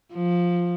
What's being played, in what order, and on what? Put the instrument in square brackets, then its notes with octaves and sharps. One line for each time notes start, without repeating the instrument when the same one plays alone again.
[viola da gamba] F3